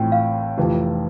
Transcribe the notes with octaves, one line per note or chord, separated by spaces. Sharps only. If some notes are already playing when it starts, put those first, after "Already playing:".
Already playing: A1 A2 F3 C4 E4 G5
F5
F1 F2 E3